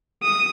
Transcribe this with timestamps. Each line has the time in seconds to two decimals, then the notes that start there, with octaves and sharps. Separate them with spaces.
0.23 D#6